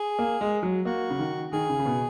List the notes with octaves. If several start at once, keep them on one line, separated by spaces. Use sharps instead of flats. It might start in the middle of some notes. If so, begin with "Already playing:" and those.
Already playing: G#4
A#3
G#3
F#3
A#3 F#4
C#3
D#3
D#3 G#4
C#3
C#3
B2